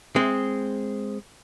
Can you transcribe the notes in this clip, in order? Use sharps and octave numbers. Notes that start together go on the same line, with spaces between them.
G#3 C4